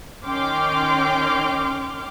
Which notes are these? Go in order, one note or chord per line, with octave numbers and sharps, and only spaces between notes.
D#3 C#4 G5 C6 D6 F6